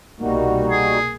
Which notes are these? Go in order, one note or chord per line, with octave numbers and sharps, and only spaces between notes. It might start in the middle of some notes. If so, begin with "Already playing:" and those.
C2 B2 G3 A#3 D#4 F#4
G#4